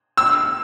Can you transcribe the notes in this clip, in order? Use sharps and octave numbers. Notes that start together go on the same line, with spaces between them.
E6